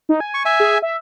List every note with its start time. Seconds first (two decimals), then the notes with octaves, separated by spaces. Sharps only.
0.09 D#4
0.20 G#5
0.34 C#6
0.45 E5 G#5
0.60 G#4
0.82 E5